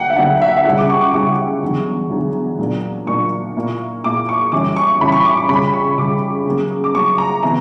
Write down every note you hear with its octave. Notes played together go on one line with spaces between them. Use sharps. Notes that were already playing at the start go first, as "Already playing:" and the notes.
Already playing: D2 D3 F#3 A#3 D4 F#5 G5
E5
D2 D3 F#3 A#3 D4 F#5
E5
E5
C#2 C#3 G3 C#4 E4 F#5
D6
C#6
D6
C#2 C#3 G3 C#4 E4 C#6
E2 D3 F#3
E2 D3 F#3
A#2 F#3 A#3 D4
A#2 F#3 A#3 D4 C#6
A#2 A#3 E4
A#2 A#3 E4 D6
C#6
F#2 E3 G3 C#4 E4 D6
C#6
F#2 E3 G3 C#4 E4 B5
C#6
D6
C#6
C#2 C#3 G3 C#4 B5
C#6
C#2 C#3 G3 C#4 D6
C#3 F#3 A#3
D6
C#3 F#3 A#3 C#6
A#5
E3 B3 E4 A#5